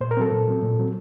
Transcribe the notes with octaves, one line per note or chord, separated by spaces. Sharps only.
A#2 C5
A#4
F#3 C4 A4
A#2
F#3 C4
A#2
F#3 C4